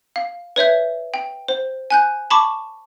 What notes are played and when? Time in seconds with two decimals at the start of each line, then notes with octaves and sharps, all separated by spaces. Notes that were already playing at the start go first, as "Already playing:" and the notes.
0.16 F5
0.56 B4 C#5 E5 G6
1.14 G5
1.48 C5
1.90 G#5 F#6 G6
2.31 A5 B5 C#6 D6